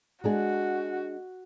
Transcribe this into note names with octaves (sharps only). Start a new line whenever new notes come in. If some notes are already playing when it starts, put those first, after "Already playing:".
G#3 D4 F#4 G#4